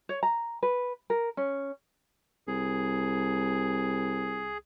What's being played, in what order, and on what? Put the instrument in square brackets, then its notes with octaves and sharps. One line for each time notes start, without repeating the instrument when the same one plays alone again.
[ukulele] C#5
A#5
B4
A#4
C#4
[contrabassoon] C2 [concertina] G#4